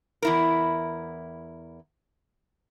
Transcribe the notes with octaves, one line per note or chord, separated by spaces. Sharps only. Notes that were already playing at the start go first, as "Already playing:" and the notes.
E2 E4 A#4